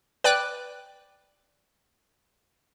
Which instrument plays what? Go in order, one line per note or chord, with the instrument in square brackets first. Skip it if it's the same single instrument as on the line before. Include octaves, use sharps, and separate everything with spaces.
[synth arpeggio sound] B4 D5 G5 D6 F#6